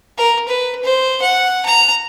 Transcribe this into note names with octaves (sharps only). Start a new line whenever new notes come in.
A#4
B4
C5
F#5
A#5